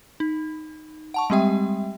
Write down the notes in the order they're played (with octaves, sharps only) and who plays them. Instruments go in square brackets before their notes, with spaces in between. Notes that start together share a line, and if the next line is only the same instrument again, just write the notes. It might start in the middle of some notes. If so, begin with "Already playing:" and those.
[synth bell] D#4
F#5 A5 C#6
G3 G#3 C4 G4 E5 G5